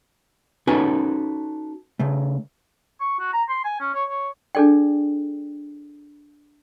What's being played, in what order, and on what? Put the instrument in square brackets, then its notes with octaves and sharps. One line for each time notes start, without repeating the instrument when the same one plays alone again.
[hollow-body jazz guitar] C#4 D#4 F#4 A4 B4 G#5
C#3 A3
[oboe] C#6
F#4
A#5
C6
G#5
C#4
C#5
C#5
[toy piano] D4 G#4 A4 D5 G5